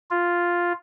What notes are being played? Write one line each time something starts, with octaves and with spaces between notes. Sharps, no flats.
F4